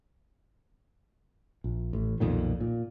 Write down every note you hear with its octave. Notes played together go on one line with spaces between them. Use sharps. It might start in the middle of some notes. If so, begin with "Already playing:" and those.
A#1
A1
B1 F2 A#2 D#3
A#2